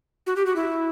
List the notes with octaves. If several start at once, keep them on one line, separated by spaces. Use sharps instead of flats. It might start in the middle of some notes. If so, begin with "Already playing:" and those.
F#4
G4
F#4
E4